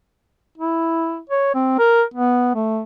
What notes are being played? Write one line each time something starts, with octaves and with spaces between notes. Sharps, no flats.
E4
C#5
C4
A#4
B3
A3